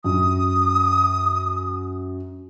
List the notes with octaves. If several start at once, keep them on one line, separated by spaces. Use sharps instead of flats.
F#2 D#6